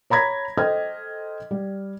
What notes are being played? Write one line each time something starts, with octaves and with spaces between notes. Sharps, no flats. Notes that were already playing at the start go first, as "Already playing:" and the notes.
C#5 A#5 B5 G#6 A#6 B6
A4 C5 D#5 G5 F6 G#6
G3